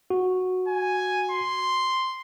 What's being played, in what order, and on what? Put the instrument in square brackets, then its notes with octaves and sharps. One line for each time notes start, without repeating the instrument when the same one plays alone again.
[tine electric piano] F#4
[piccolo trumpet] G#5
C6